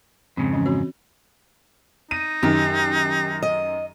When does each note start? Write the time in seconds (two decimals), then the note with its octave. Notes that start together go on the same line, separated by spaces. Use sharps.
0.37 F2 G#2 C#3 C4
0.53 E3 C#4
0.66 C4 F#4 C#5
2.11 D#4 D#7
2.43 F#2 D#3 G4
3.43 D#5